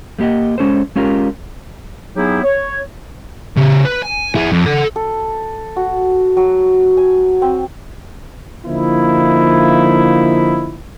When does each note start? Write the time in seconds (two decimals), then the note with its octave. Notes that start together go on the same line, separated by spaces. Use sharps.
0.19 A3 A#3 G4 D#5 F#5
0.58 G#3 C#4 A4 C5
0.96 G#3 C#4 F4 G4 A#4
2.16 F#3 B3 D#4 E4 G4 G#4
2.44 C#5
3.57 C#3 G4
3.85 B4
4.02 G#5
4.35 E4 G#4
4.52 F2
4.66 A4 F#5
4.96 A4
5.76 F#4
6.37 F#3
6.97 G#5
7.42 C4
8.65 D3 F3 A#3 D#4 E4